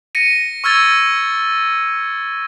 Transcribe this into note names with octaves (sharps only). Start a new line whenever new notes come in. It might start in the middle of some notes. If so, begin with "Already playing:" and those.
A#6 C#7 D#7
C#6 E6 F6 G#6 A6